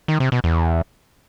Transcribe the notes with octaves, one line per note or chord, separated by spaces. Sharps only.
D#3
C3
B2
E2